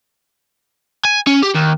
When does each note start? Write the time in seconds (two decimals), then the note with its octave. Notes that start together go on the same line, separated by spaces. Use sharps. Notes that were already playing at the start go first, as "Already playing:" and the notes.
1.05 G#5
1.27 C#4
1.43 G4
1.55 D#2